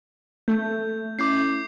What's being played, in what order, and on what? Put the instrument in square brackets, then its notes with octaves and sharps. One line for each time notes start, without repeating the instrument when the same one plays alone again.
[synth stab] A3 [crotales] G6
[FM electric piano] C#4 E4 [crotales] D6 G6 C7